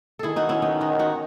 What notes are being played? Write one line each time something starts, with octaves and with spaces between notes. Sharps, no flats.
D#3 E4 G#4 A4
D#4 F#4
C#4 E4
B3 D#4
D#4 F#4
D#4 F#4